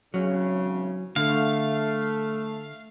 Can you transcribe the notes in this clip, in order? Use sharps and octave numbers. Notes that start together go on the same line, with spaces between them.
G#1 E2 C#3 F#3 C#4
D3 A3 F5